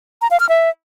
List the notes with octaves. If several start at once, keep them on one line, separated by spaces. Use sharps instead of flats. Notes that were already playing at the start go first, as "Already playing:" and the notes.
A#5
F5
F6
E5